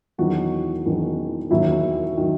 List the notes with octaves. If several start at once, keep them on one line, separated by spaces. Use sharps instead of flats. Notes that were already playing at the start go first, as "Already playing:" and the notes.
E1 E2 D#3 F#3 F#4
E1 E2 D#3 F#3
E1 D#2 D#3 F#3 E4
D#3 F#3